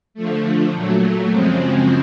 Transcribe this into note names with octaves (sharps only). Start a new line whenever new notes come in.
D3 F3 A3
A#2 F#3 A3
F#2 C#3 F3 G#3 C4